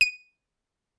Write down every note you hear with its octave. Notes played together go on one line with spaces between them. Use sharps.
D#7